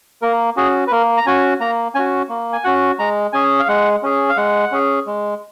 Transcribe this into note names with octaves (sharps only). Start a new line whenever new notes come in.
A#3 A#4
C#4 F#4 G#4
B4
A#3 A#4
A#5
C#4 F#4 G#5
A#3 A#5
C#4 F#4 G#5
A#3
G#5
C#4 F#4 F#5
G#3 A#5
C#4 G#4 G#5
F5
G#3 F#5
C#4 G#4
F5
G#3 F#5
C#4 G#4
G#3